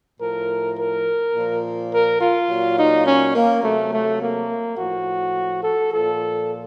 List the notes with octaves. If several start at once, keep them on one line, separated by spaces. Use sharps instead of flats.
A2 F3 A#4
A#4
A#2 F3
A#4
F4
A#2 F#3
D#4
C#4
A#3
C3 F#3 A3
A3
A#3
A2 F3 F#4
A4
A#2 F3 A4